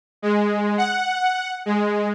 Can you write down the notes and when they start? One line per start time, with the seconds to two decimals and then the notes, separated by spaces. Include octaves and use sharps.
0.22 G#3
0.78 F#5
1.66 G#3